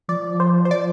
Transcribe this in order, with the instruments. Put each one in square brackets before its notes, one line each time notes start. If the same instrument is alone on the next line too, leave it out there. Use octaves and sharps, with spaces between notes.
[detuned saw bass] F3 [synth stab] D5
[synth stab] C5
C5
[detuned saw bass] F3 [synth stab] D5